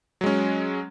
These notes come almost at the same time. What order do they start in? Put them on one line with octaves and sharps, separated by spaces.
F#3 G#3 C#4